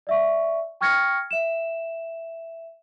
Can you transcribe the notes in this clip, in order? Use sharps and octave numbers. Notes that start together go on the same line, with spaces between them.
D5 E5 C#6
G5 C#6 F6 G#6 A#6 C#7
E5 E7